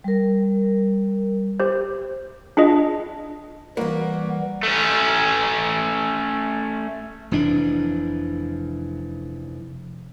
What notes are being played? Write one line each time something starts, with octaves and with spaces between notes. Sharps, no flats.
G3 A#4
G4 C5
D4 F4 G#4 D#5
E3 G3 A#3 B3 F#4
A3 C#4
F1 F2 E3 D4